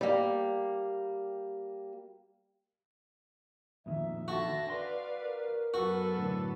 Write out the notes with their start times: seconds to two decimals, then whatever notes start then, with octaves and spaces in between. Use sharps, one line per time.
0.01 G3 A#3
3.86 F2 A#2 D#3 E5
4.28 D3 F#4 A5 A#6
4.70 B4 D5 F5 C6
5.20 A#4
5.74 F#2 B3 F#4 A4
6.16 B1 A2 D3